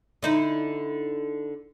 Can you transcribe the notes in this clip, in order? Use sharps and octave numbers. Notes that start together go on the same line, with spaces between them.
D3 D#4 E4